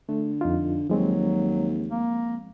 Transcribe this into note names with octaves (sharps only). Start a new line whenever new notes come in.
D3 A3
F2 D#4 F4
D#2 F3 F#3 G#3 C4
A#3